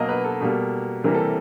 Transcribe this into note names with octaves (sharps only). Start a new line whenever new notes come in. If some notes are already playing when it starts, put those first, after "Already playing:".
Already playing: B2 F#3 A#3 D#5 F5
B4
A4
B2 G3 A#3
C3 E3 G3 A#3 A#4
A4